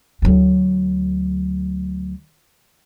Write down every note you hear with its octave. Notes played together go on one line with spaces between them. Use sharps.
D2 F#3